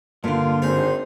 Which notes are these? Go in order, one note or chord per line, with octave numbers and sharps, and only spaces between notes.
G2 A#2 D3 F4
G#1 D#4 G#4 C5